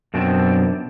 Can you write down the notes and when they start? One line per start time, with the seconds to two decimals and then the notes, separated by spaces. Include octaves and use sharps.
0.14 F#2 B2 F3 C4 D4